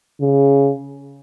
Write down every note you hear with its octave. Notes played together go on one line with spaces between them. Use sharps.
C#3